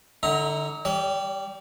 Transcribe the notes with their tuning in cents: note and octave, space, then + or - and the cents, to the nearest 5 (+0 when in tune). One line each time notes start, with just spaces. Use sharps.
D3 +10 E4 -45 A#5 +0
G3 +0 D5 -45